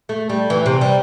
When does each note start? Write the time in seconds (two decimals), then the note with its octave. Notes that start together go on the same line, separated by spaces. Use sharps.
0.09 A3
0.29 G3
0.50 E3
0.66 C3
0.81 G3